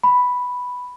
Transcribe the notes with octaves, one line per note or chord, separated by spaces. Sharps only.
B5